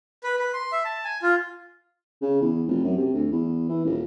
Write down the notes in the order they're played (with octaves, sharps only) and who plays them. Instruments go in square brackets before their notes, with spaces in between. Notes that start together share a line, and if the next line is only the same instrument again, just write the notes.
[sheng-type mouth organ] B4
B4
C6
E5
A5
G#5
F4
[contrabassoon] C#3
E2
F1
F#2
C3
D2
E2
E3
D#1